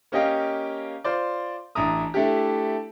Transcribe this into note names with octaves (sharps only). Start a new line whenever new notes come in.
A#3 C#4 G4 D#5 F5 G5
F4 C5 D5
A1 D4 E4 A#5 D#6
A3 D4 E4 G4